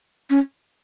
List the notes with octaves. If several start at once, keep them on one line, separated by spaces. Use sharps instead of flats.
C#4